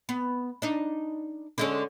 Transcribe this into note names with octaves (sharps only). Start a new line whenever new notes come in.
B3
D4 D#4
D3 G#3 C#4